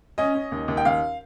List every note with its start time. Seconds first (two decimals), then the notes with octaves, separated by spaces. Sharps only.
0.18 C#4 D#5
0.35 C#4
0.52 D#2
0.68 D#2
0.77 G5
0.85 D#2 F5